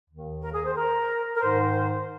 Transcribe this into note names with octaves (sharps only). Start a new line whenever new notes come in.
D#2 D#3
A#4
G#4
C5
A#4
A#4
G#2 D#3 C5